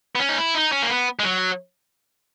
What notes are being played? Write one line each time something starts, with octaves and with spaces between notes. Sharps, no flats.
B3
C#4
D#4
E4
D#4
C#4
A#3
B3
G#3
F#3